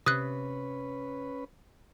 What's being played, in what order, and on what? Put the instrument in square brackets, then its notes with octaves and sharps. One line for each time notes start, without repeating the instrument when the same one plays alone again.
[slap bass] C3 [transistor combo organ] C#4 B4 [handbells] D#6 F#6